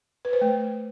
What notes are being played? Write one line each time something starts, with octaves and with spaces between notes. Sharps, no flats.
B4
C5
A3